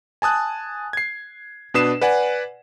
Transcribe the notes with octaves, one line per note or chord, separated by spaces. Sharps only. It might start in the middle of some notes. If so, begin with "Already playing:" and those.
G#5 A5 D#6 F#6
G#6 C7
B2 D4 B4 D#6 C7 E7
B4 D5 F#5 G#5